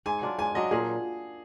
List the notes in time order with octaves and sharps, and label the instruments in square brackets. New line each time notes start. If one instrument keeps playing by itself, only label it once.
[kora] G#2 [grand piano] G#5
[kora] F#3 D4 F4
[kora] G#2 [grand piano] G#5
[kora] F#3 D4 F4 [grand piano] D#5
[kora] A#2 [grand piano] G#4